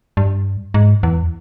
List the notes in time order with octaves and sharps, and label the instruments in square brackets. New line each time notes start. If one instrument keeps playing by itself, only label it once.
[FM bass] G2
G#2
E2